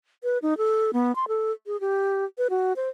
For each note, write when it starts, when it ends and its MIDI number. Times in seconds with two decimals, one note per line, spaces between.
0.24 0.38 71
0.42 0.57 63
0.58 0.91 69
0.93 1.15 59
1.16 1.28 84
1.28 1.52 69
1.67 1.79 68
1.81 2.25 67
2.38 2.47 71
2.50 2.73 66
2.76 2.89 72